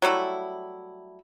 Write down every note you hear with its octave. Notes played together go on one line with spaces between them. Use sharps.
F#3 G3 A3 E4